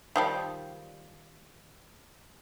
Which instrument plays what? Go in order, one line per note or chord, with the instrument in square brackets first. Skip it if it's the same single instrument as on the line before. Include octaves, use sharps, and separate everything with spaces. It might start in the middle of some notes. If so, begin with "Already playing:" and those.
[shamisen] D#3 F3 G3